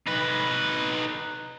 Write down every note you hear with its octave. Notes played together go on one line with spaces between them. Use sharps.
D#4 B4